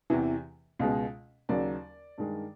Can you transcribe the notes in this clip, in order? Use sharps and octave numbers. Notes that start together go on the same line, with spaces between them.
E2 C3 E3
C#2 B2 G#3
D#2 C#3 F#3 D5
G2 D#3 G#3